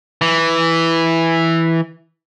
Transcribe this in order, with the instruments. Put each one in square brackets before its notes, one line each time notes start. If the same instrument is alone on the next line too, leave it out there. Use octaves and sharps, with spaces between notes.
[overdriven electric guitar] E3